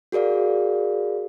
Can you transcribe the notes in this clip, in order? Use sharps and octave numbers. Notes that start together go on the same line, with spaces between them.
F#4 G#4 A#4 D5 F5